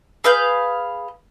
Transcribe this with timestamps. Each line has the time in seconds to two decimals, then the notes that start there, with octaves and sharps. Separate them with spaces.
0.24 G#4 B4 F5 G6